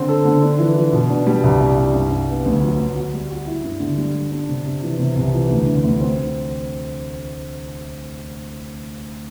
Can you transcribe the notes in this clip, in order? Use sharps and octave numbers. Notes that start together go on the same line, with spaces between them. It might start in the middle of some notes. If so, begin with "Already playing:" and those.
Already playing: D3 C4
A4
D3
D4
E3
E3
B2
D4
G3
C2
C2
C2
G2
G2
B3
D2
F#3
D2
F#4
G3
F#4
E4
G2
D3
G3
G3
D4
C3
C3
E3
C3
C2
E3
D2
D3
D2
C4